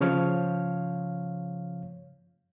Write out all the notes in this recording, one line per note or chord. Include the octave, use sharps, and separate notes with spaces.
C#3 F3 C#5 F5 F6